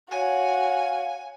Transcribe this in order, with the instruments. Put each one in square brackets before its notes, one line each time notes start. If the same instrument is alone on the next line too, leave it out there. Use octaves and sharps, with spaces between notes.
[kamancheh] F#4 [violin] C#5 [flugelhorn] F5 [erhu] G#5